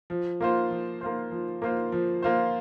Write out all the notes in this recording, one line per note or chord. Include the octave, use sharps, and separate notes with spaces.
F3
A#3 F4 C5
F3
A#3 F4 C5
F3
A#3 F4 C5
F3
A#3 F4 C5